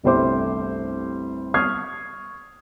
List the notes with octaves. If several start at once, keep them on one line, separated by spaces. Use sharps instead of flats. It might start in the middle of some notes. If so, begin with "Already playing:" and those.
G1 C2 G3 A3 C5 D6
C#6 D#6 F6 G#6 C7